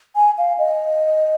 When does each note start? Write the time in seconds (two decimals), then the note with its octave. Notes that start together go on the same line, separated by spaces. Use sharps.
0.16 G#5
0.38 F5
0.58 D#5